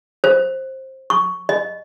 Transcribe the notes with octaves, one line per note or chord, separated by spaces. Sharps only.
C5
C#6
D#5